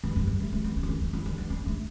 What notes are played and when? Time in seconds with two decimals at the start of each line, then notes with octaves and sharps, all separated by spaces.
0.04 G2
0.16 G2
0.27 G3
0.40 A3
0.53 A3
0.64 B3
0.76 D4
0.83 E4
0.89 D4
1.01 D4
1.13 E4
1.26 D4
1.38 B3
1.50 D4
1.66 A3